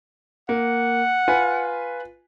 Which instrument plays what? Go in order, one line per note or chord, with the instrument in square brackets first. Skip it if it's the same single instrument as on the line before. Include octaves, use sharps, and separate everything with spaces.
[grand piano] A#3 [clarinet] F#5
[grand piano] F4 B4 G#5